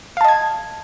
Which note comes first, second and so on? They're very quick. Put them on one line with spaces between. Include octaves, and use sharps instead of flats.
F5 A5 D#5 G#6